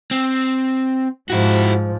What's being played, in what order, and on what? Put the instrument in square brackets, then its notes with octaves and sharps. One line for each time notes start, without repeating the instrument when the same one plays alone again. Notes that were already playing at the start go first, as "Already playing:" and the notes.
[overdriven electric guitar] C4
[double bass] G#2 F3 [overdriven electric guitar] E4 F#4